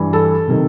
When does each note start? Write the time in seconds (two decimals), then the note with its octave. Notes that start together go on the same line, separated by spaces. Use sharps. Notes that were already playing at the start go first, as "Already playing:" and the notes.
Already playing: G2 E3
0.13 A4
0.48 C3 D#3